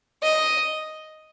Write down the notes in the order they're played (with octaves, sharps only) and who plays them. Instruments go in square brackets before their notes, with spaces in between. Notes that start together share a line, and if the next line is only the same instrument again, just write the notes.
[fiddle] D#5